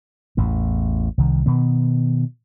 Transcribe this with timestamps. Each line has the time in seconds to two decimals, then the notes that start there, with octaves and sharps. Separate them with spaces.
0.37 A1 E2 A2
1.18 C2 D#3
1.46 B2 D#3 B3